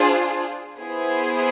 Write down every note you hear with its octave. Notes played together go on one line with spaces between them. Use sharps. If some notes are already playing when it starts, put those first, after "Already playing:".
Already playing: D4 F4 G#4 C5
B3 E4 G#4 C5